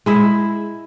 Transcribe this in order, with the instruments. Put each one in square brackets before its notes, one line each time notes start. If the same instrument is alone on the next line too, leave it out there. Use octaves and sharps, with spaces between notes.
[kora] G#3 E4 E5